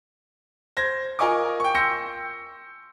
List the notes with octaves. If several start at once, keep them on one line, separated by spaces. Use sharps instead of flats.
C5 G#6 A#6
F4 A#4 D#5 G#5 C#6 D6
G5 C#6
C6 E6 G6 A#6 C#7